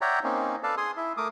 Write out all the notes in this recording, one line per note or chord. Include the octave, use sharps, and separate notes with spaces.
C#5 D5 E5 F#5 G5 A#5
A#3 C4 C#4 D#4
A4 B4 D5 F5 A5
G#4 G#5 C6 D#6
E4 E5
A3 A#4 D6 D#6